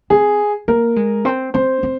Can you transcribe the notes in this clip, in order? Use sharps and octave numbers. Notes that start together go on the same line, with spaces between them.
C4 G#4
A#3 A#4
G#3
C4
C4 C5
C4